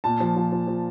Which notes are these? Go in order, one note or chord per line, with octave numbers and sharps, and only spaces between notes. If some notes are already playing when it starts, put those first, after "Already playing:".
A#2 A5
F3
F3
F3
F3